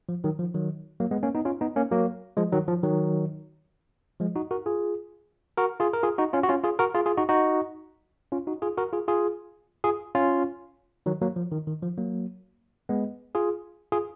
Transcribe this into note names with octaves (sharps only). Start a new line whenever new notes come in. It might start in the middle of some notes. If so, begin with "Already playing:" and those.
F3
D#3 F#3
F3
D#3 F#3
F#3 A#3
G#3 B3
A#3 C#4
B3 D#4
C#4 F4
B3 D#4
A#3 C#4
F#3 A#3
F3 G#3
D#3 F#3
F3
D#3 F#3
F3 G#3
D#4 F#4
F#4 A#4
F4 G#4
F#4 A#4
F4 G#4
A#4
F4 G#4
D#4 F#4
C#4 F4
F#4
C#4 F4
F4 G#4
F#4 A#4
F4 G#4
F4 G#4
D#4 F#4
D#4 F#4
C#4 F4
D#4 F#4
F4 G#4
F#4 A#4
F4 G#4
F4 G#4
F4 G#4
C#4 F4
D#3 F#3
F#3 A#3
F3
D#3
D#3
F3
F#3 A#3
G#3 B3
F4 G#4
F4 G#4